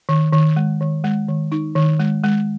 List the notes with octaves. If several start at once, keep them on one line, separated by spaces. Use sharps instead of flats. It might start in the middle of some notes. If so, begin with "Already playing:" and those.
D#3
D#3
G#3
D#3
G#3
D#3
D#4
D#3
G#3
G#3